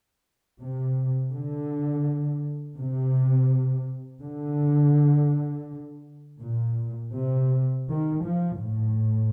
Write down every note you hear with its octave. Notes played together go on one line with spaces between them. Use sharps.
C3
D3
C3
D3
A#2
C3
D#3
F3
A2